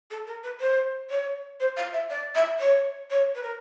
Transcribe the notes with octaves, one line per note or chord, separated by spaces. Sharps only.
A4
A#4
B4
C5
C#5
C5
F5
E5
D5
E5
C#5
C#5
B4
A#4